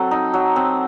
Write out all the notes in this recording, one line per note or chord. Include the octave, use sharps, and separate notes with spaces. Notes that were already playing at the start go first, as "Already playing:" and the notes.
Already playing: F#3 C4 A4
D#4
F#3
C4